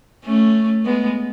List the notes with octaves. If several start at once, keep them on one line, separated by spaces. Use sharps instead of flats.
A3 C#4
G#3 B3